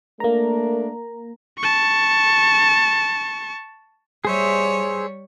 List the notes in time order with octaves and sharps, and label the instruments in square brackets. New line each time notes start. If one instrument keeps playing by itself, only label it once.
[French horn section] A3 D4 A#4 [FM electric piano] A#3 A#5
[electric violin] A5 C#6
[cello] G3 C#5 [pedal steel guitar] G#4 C5 E5